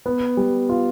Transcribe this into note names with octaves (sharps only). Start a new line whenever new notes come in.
B3
G3
F4